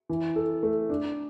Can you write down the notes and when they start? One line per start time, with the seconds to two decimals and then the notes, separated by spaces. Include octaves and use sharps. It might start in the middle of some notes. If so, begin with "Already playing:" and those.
0.09 E3
0.36 A4
0.63 A3
0.90 D4